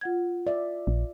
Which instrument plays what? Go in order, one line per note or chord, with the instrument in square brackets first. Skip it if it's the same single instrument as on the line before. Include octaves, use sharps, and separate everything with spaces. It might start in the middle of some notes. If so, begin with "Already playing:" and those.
[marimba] F4 F#5 G#6
[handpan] D5 E5
[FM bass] A#1